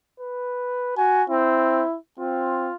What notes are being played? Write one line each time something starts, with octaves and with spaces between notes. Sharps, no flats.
B4
F#4 G#5
C4 E4
C4 F4